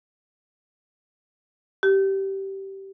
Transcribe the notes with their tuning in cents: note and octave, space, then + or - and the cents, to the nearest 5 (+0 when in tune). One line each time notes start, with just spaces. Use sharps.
G4 -15